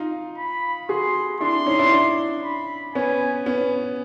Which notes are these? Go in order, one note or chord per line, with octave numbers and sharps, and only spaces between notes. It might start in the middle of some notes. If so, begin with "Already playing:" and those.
Already playing: D#4 F4
B5
F#4 G#4 C6
D4 E4 C6
C#4 D#4
D4 E4
D4 E4
B5
B3 C#4 G#5
B3 C#4